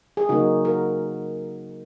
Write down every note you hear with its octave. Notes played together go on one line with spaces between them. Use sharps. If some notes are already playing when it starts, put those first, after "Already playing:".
G#4
C#3 F#3 A#3 D#4 F#4
F#4 A#4